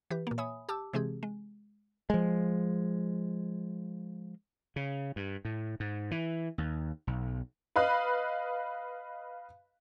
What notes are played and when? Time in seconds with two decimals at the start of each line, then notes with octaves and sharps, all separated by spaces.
0.10 E3 G4 B4
0.27 A#2 A#3
0.38 C#5 E5 G#5 B5 D#6
0.69 G4 A5 D6 E6
0.93 C3 E3 G#3 C4 G4 G#4
1.23 G#3
2.10 F3 G#3
4.76 C#3
5.16 G2
5.45 A2
5.80 G#2
6.11 E3
6.58 D#2
7.07 B1
7.76 B4 D#5 F5 B5 F#6